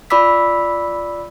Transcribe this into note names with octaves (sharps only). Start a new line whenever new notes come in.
F4 D5 B5 D6 E6 B6